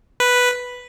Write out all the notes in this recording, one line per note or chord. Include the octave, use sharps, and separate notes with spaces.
B4